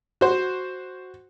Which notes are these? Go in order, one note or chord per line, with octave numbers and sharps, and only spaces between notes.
F#4 C5